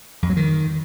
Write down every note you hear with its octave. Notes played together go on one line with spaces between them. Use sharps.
F2
F#3
D#3